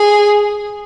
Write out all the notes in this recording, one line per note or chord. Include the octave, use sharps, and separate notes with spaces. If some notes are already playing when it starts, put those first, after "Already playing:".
Already playing: G#4